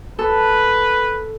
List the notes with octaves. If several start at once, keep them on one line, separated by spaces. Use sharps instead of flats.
A4 B4